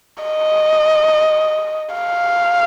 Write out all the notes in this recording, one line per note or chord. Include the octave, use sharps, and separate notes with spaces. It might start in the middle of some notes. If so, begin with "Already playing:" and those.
D#5
F5